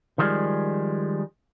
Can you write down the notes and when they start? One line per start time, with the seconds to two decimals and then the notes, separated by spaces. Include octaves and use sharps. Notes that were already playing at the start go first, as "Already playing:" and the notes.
0.18 D#3 F3 G3 G#3